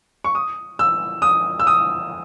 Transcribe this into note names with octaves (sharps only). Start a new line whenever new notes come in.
C#6
D#6
E6
D#6
E6
D#6